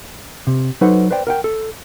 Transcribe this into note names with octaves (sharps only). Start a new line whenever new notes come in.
C3
F#3 D#4 A4 B4 C5 F#5
B4 C5 D5 G5
A#4 F#5 G5
A4